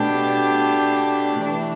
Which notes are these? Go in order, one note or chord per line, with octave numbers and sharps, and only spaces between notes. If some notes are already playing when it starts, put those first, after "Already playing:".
Already playing: B2 A3 D4 G4
E3 A3 D4